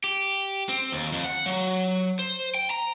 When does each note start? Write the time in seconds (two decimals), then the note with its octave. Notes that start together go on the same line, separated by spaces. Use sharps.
0.04 G4
0.69 C4
0.92 D#2
1.12 F2
1.25 F#5
1.46 F#3
2.19 C5
2.55 G5
2.71 A#5